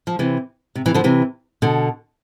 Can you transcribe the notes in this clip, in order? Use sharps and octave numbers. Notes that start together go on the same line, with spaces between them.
F3
C3 E3
C3
C3 E3
D3 F3
C3 E3
B2 D3